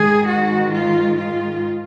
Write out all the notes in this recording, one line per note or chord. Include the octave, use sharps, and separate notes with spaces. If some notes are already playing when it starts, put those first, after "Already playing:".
Already playing: G#2 D#3 G#3 G#4
F#4
F4
F4